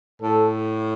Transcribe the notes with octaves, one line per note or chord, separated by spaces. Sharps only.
A2 A4